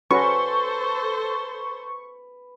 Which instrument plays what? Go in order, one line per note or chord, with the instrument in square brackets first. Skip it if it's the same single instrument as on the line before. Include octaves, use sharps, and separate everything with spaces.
[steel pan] C#4 F#4 [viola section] A4 C5 [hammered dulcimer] B4 [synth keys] C#6